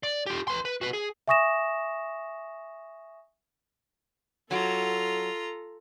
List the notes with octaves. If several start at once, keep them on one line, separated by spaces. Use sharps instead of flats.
D5
F4 G4
B4 C6
B4
F#4 B4
G#4
E5 G#5 C#6 D#6 A#6 E7
F#3 F4 F#4 A4 A#5